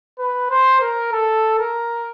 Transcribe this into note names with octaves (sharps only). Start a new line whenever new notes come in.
B4
C5
A#4
A4
A#4